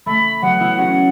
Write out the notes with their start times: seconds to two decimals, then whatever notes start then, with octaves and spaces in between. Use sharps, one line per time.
0.06 A3 B5
0.42 F#3 B3 F#5
0.60 B3 E4
0.78 C#4 F#4 F#5